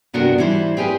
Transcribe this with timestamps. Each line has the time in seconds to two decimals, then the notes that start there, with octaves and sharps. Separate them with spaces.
0.14 G2 C3 B3 D4 F#4 A#4
0.38 E3 G3 E4 C5
0.77 C4 G4 G#4 A#4 B4